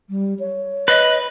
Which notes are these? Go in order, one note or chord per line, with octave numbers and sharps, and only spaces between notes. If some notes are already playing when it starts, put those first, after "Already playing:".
G3
C#5
B4 D#5